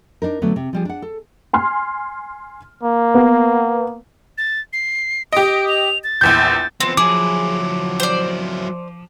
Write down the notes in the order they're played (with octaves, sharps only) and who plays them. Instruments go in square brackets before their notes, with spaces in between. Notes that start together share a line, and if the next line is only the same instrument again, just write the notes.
[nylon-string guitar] D4 D#4 A#4
D3 F#3 A3 B3
C3
F3 G3 G#4
D4 F#5
A4
[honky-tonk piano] G#5 C6 F6
[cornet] A#3
[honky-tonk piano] B3
[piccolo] A6
C7
[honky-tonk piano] G4 D#5 [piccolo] D7
[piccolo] F7
A6
[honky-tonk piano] A#1 E2 G6
[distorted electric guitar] F2 B3 [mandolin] C4
[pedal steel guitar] F3 [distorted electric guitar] F#3 E4 [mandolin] G#4 [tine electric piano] D6
[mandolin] C5 D5